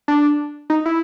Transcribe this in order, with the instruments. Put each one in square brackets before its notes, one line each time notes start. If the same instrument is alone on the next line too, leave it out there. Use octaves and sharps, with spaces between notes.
[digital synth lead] D4
D#4
E4